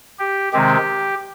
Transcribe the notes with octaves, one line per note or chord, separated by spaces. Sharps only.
G4
C3 D#3 G#3 C4 G4